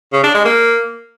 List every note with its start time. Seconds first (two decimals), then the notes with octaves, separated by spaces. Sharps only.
0.13 C#3
0.24 D4
0.34 G#3
0.45 A#3